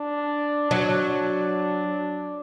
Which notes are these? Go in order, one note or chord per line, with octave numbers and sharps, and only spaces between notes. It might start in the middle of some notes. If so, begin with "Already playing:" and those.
Already playing: D4
F#3 D4